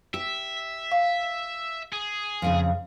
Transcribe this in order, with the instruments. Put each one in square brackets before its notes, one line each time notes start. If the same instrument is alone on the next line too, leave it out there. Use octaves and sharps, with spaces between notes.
[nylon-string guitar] G4 [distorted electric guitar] E5
[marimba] F5
[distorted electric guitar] G#4
[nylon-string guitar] F2 A2 C#3